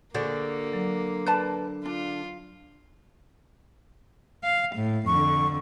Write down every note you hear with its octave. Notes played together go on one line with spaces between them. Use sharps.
D3 A#3 F#4 G#4 C5 D5
F#3
B4 D5 A5
D4 F4
F5
A2
F2 D3 C#6